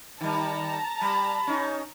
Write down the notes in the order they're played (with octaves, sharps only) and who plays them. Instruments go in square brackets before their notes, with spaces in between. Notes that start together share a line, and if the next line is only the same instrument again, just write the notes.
[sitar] D#3 G3 [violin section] A5 A#5
[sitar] G3 [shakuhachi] B5
[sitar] C#4 D#4